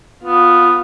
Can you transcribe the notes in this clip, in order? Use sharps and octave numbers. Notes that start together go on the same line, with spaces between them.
B3 F4